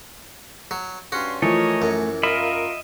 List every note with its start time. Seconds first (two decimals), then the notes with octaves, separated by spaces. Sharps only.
0.71 F#3
1.12 G2 C#4 F#4 C6
1.42 E3 F3 A3 A#4 C#5 D#5
1.82 F#2
2.23 F4 A#4 D#5 E5 B5